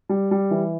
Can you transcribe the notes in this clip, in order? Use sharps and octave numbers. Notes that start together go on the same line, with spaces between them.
G3
G3
E3